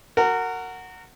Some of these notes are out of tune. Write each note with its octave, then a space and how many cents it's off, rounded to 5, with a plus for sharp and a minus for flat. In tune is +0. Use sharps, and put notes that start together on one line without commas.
F#4 +0 A#4 -25